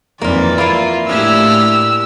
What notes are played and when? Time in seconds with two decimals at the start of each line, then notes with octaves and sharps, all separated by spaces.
0.21 F2 D#3 E3 A#3 F4 D5
0.58 A#3 E4 F4
1.09 A2 D4 E4 G4 G#5 E6 F6